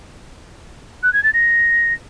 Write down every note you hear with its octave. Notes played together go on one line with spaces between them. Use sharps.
F#6
G#6
A6
A#6